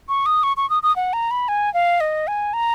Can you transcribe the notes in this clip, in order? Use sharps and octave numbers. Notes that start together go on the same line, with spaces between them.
C#6
D#6
C#6
C#6
D#6
D#6
F#5
A#5
B5
G#5
F5
D#5
G#5
A#5